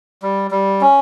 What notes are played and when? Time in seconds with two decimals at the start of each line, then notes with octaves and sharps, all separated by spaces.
0.22 G3
0.51 G3
0.81 C#4